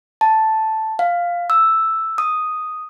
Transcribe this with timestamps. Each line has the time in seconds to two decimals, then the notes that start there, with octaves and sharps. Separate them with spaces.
0.21 A5
0.99 F5
1.50 E6
2.18 D#6